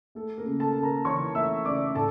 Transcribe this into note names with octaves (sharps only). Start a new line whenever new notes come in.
A3 A4
A#3 A#4
C#3
A4 A5
C#3
A#4 A#5
E3 C#5 C#6
A3 E5 E6
C#3 D5 D6
A2 A4 A5